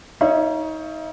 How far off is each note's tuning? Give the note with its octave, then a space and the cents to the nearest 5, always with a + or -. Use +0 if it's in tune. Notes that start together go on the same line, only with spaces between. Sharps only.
D#4 +25 C#5 +0 F5 -45